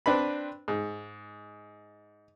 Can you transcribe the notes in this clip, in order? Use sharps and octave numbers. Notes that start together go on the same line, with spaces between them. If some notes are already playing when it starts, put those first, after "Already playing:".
C4 D4 B4 B5
G#2